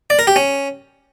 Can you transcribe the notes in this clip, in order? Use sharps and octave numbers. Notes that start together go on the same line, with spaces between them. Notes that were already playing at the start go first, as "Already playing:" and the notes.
D5
A#4
G4
C#4